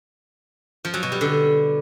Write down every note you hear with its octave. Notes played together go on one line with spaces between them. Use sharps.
F3
F#3
B2
G3
D3